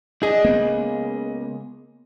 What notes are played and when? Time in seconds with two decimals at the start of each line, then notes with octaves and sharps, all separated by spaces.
0.23 D4 G#4 D#5
0.45 C#2 A#3 B3